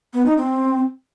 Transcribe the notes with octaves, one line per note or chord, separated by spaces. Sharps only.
B3
D#4
C4